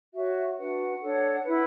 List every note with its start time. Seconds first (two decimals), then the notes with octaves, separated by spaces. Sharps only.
0.14 F#4 C#5 E5
0.57 D4 F#4 B4 F#5
1.01 D4 A4 C#5
1.43 E4 B4